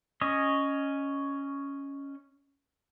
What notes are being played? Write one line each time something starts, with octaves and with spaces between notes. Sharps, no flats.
C#4 C#5 D#5